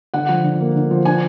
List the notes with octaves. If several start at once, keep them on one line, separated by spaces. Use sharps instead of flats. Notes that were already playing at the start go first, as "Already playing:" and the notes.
D3 F#5
F3
D3
A#3
D3
F3
D4 G#5